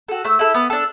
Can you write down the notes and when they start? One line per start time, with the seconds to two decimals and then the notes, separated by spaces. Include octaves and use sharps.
0.08 F#4 A4
0.24 A3 E6
0.39 E4 A4
0.54 B3
0.70 D4 A4